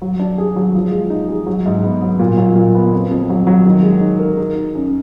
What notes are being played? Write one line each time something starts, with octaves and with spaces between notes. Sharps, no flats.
F#3
D4
G#4
F#3
F3
G#3
D#4
G#4
F#3
G#2
B3
F#3
A#2
F#3
A#2
B3
F2
F2
F#3
F#3
D#3
G#3
D#4
A#4
D#4
D#4
F#2